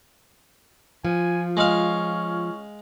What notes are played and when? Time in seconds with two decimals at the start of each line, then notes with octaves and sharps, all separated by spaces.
1.05 F3 F4 G#5
1.57 G#3 C#4 F5